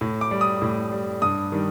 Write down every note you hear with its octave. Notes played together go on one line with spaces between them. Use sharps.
A2
D6
G3
D#6
A2
G3
G2 D#6
D#3 G3